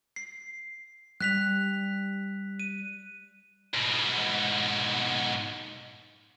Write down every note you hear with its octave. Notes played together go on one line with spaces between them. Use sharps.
C7
G3 F#6 B6 F7
D#7
G#2 B2